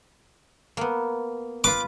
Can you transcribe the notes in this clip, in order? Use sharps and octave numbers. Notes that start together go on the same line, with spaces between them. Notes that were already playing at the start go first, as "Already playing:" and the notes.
A#3 B3
F4 B4 D6